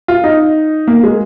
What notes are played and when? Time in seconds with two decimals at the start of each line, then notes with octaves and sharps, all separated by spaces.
0.08 F4
0.24 D#4
0.88 A#3
1.04 G#3